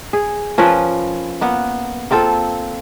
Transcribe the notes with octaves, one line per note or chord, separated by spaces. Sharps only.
G#4
F3 C#4 A#4 B4
A#3 B3 F#5
A#3 C4 F4 A4